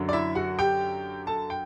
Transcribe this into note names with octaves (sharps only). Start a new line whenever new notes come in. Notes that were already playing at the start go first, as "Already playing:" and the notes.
Already playing: F#2 D3 F#3
D5
E4 E5
F#4 F#5
G4 G5
A4 A5
G5